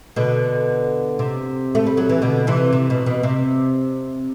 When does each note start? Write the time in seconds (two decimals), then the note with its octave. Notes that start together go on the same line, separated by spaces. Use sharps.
0.16 B2 D3
1.19 C3
1.75 A3
1.86 G3
1.97 F#3
2.09 E3
2.22 B2 D3
2.47 C3 E3
2.73 C3
2.90 B2
3.06 B2
3.23 C3